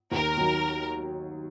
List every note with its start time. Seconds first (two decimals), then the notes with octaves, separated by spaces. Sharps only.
0.12 D#2 A#4
0.37 D#3 F#3